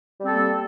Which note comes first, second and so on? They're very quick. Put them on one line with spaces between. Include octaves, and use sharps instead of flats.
G3 C4 A4 A#3